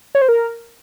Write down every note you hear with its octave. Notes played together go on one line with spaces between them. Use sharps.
C#5
C5
A#4